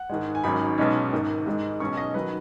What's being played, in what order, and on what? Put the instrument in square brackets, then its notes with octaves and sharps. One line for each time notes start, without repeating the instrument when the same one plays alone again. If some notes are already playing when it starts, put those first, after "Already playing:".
Already playing: [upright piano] F#5
G#2 D#3 G#3
G#5
G#1 G#2 F#3 C#4 B5
B1 B2 G#3 C#4
G#1 G#2 D#3
G#2 D#3 G#3
B1 B2 G#3 C#4 C#6
D#5
D#3 F#3 B4